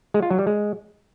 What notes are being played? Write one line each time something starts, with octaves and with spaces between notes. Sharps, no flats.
G#3
F4
F#3
G3
G#3